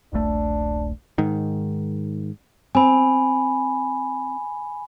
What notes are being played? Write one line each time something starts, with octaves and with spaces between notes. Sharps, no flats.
D#1 A#1 A3 D4
G#2 D#3
C4 G#5 B5